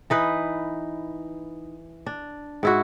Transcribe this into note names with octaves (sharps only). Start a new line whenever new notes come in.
E3 D#4 B4
D4
G#2 E4 F#4